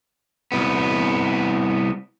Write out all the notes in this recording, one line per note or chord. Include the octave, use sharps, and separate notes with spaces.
C2 B3